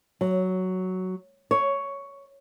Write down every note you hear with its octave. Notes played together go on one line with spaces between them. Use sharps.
F#3
C#5